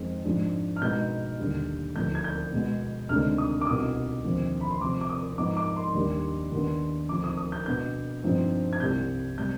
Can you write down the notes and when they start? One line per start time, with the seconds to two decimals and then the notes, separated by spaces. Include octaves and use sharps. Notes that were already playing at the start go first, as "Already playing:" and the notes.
Already playing: F2 D#3 G#3 C4
0.24 G#2 F3 G#3 D4
0.76 F6
0.82 B2 G#3 B3 D#4 G6
1.39 D#2 D3 G3
1.96 D2 D3 F3 B3 D#4 G6
2.15 G#6
2.24 G6
2.52 B2 G#3 B3
3.09 D2 C3 D#3 G#3 D4 F6
3.38 D#6
3.61 D6
3.67 C2 B2 B3 D#4 D#6
4.24 D#2 D3 F3 C4
4.61 B5
4.71 C6
4.81 C3 F3 C4 D6
5.01 D6
5.09 D#6
5.38 G#2 F3 B3 D#4 D6
5.57 D6
5.76 C6
5.95 D#2 D#3 G3 D4
6.52 D#2 D#3 B3 D4
7.09 D2 D3 F3 C4 D#4 D6
7.24 D#6
7.37 D#6
7.52 G6
7.66 B2 B3 D4 G6
8.23 G2 F3 C4 D#4
8.73 G#6
8.80 C2 C3 G3 G6
9.38 C3 G3 C4 G6